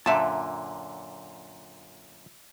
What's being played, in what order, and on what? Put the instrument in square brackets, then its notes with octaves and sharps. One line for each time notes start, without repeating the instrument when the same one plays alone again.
[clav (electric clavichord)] F#2 A#2 D3 [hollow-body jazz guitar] E5 A5